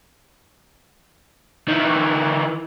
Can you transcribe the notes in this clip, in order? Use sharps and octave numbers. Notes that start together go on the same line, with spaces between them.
D#3 E3